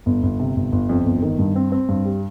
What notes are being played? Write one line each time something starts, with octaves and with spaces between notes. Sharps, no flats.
G1
G1
C3
G1
G1
F2
G1
D#3
G2
C4
C4
G2
G3